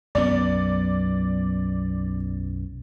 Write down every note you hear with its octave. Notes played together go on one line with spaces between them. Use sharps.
B1 F#2 B3 D5